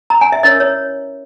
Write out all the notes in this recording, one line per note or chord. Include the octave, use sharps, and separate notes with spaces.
A#5
G#5
E5
C#4 E4 A#4 C#5 D#5
C#5